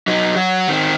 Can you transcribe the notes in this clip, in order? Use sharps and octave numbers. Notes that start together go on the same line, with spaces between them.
F#3 D#4
F#3 F#4
D#3 C4